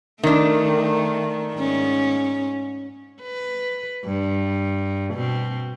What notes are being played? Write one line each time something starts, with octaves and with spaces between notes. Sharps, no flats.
D#3 A3 D4
G#2 C#4
B4
G2
B2 C4